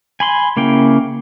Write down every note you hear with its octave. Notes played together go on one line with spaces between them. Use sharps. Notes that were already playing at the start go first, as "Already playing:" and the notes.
G#5 B5 C6
C#3 A#3 E4 G5